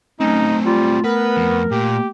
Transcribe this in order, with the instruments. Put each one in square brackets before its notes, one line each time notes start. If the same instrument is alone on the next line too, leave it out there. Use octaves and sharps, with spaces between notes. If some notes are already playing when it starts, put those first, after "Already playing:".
[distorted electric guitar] F#3 C4 [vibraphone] A3 [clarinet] C#4 [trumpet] D#4
[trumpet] G3 [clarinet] F4
[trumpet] B3 [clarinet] A#4 [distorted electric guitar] B4
[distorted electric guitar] F2
[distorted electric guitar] A#2 [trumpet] G4